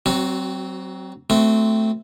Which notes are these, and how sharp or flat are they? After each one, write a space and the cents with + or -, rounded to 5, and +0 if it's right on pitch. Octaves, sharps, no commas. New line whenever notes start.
F#3 +35 C4 +0 F#4 +0
A3 +0 C4 -15 F#4 +0